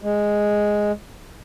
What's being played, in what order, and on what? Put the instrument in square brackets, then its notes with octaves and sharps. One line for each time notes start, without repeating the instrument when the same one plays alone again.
[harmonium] G#3